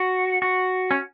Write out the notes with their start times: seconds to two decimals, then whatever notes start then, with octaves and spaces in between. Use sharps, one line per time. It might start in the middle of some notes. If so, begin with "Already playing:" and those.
Already playing: F#4
0.42 F#4
0.91 C#4